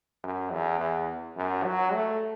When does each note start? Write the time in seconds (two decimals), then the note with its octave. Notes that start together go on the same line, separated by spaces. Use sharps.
0.24 F#2
0.52 E2
0.80 E2
1.37 F#2
1.65 F#3
1.93 A3